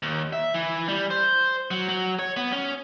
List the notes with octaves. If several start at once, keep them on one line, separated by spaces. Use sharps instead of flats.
D#2
E5
E3
G3
C5
F#3
F#3
C#5
B3
C#4